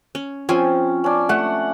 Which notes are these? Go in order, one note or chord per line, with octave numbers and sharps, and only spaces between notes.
C#4
F3 C4 C#4 G#5
C#4 D4
A3 F#5